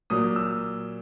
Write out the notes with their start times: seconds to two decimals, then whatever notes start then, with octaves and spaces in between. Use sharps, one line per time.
0.10 A#2 F#3 D#6
0.36 E6